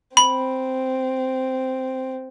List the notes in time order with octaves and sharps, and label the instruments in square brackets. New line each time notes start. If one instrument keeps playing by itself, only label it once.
[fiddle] C4 [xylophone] B5